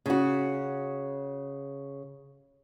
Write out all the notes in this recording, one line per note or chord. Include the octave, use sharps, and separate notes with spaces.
C#3 F#4